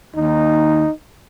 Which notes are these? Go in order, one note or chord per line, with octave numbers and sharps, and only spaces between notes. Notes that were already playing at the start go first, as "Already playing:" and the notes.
D#2 D#4